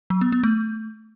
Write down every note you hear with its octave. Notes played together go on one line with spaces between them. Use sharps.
F#3
B3
B3
A3